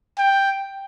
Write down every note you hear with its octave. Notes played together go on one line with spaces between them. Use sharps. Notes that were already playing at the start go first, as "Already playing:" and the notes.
G5